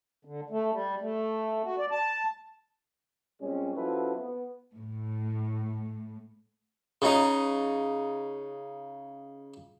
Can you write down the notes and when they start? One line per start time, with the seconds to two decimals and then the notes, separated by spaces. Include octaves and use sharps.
0.25 D3
0.50 A3
0.72 G3
1.01 A3
1.64 F#4
1.78 D5
1.91 A5
3.41 A#2 G3 G#3 C4 C#4
3.76 F3 C#4 E4 F#4 A4 B4
4.16 B3
4.76 A2
7.02 C#3 D#4